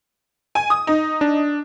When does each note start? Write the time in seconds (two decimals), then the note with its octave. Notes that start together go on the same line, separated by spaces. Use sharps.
0.55 G#5
0.70 D#6
0.87 D#4
1.21 D4